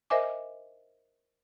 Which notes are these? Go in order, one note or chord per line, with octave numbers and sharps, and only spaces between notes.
A#4 C5 D#5 E5 G#5 D6